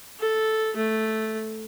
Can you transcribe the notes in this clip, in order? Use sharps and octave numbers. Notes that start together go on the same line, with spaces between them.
A4
A3